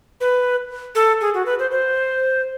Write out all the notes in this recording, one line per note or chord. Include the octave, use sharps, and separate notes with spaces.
B4
A4
G#4
F#4
B4
C5
C5